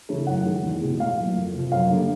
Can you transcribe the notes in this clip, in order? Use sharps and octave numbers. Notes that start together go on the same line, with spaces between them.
C#3 E3 A3
F#2 F#5
D#3 G#3
E2
B2 G#3
A2 F5
F#3 A#3
F2
C3 F3
F#2 F5
D3 G3 A#3